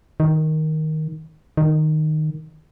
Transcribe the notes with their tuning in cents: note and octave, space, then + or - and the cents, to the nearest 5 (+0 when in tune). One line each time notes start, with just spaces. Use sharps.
D#3 +5
D#3 -10